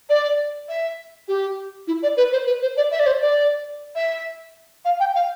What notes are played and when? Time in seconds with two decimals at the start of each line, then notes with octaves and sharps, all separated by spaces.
0.09 D5
0.68 E5
1.28 G4
1.87 E4
2.02 D5
2.17 B4
2.32 C5
2.47 B4
2.62 C5
2.76 D5
2.91 E5
2.99 D5
3.06 C5
3.21 D5
3.95 E5
4.85 F5
5.00 G5
5.14 F5